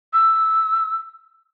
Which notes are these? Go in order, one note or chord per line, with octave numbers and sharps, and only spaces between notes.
E6